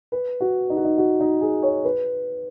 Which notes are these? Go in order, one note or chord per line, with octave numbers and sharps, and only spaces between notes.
B4
F#4
D#4
F#4
D#4
F#4
D#4
G#4
C#5
B4